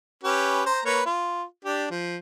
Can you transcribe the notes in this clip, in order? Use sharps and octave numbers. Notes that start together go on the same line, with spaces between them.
C#4 G4 B4
C5 A#5
A#3 B4 C#5
F4
D4 G4
F3